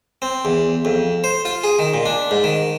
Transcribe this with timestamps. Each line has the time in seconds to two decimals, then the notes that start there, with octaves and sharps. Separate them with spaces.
0.22 C4
0.45 E2
0.85 F2
1.24 C5
1.45 F4
1.64 G#4
1.79 D#3
1.94 A#2
2.06 D4
2.31 G#2
2.44 D#3